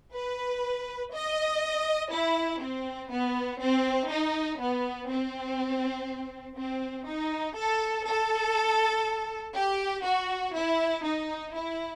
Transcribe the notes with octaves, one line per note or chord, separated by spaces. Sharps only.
B4
D#5
E4
C4
B3
C4
D#4
B3
C4
C4
D#4
A4
A4
G4
F#4
E4
D#4
E4